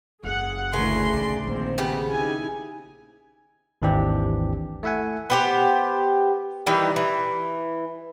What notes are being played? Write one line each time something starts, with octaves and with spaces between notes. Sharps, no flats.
F#1 F#2 G#4 F#5
D2 C#3 E3 A#4 G#5 C6
A#1 D#2 D5
A#1 D#3 A#3 C4
C#3 B3 G4
D#4 E4 G#5
G#1 D#2 E3 C4 D4 G4
A3 E4 E5 F#5 G#5
B3 G4 C5
D#3 E3 G3 D#4
E3